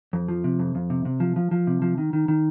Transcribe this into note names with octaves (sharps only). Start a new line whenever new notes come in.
F2
F3
C3
F2
F2
C3
C3
F3
F3
F3
C3
F3
D#3
D#3
D#3